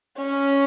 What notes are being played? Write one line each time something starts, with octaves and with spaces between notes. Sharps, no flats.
C#4